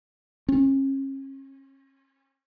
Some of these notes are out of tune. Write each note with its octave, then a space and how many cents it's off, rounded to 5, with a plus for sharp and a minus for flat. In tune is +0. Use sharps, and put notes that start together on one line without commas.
C#4 -35